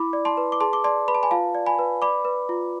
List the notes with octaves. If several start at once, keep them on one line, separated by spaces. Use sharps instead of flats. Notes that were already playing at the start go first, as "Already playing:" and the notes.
Already playing: E4 B5 D6
D5
A5 C6
B4
D6
G#4 A5 C6
D6
D5 A5 C6
B4 B5
A5
G#5 B5
F4 F5 A5
D5
G#5 B5
B4
D5 B5 D6
B4
F4